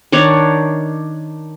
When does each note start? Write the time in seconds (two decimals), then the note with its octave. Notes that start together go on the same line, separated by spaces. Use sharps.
0.12 D#3 D4 C#5